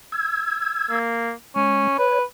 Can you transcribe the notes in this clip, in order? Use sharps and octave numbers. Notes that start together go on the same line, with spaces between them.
E6 G#6
A#3
G#3 C#4
B4 C#5